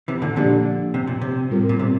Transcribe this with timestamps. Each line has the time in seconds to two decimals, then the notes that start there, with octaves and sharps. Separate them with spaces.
0.08 C3 E3
0.22 A#2 D3
0.36 A#2 D3 F3 A#3 D4 G4 D5
0.94 C3
1.07 A#2
1.21 C3
1.50 A2 G3 C4 F4 A#4
1.69 A#2
1.80 C3